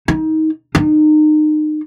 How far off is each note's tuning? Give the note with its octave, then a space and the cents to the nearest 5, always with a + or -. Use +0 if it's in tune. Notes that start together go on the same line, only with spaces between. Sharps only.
D#4 +20
D#4 -30